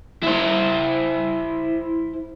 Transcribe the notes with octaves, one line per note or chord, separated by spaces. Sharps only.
E4 C5